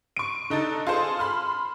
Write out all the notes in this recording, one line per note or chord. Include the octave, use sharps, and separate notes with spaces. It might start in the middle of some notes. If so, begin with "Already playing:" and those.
C#6 D7
D3 D#4 A4 A6
F4 G#4 A4 C5
B5 C6 F6